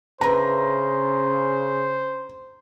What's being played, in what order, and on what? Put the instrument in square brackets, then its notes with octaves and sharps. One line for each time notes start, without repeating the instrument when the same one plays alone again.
[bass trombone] C#3 [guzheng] D4 E4 B4 [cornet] C5 [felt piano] A#5